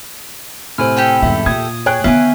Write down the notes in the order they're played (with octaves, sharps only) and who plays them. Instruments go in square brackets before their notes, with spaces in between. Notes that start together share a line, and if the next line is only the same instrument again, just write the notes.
[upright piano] A2 C3 [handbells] C5 G#5 F6
[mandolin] G4 A4 G5
[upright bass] E2 G#2 [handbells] E5
[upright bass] A#2 [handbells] D#6 [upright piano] G#6
[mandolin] G#4 [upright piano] C#5 G5 F#6
[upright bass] D3 B3 [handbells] E5 G#5 [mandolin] F5